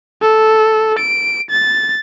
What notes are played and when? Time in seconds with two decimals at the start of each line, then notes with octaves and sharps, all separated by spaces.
0.22 A4
0.99 D7
1.50 A6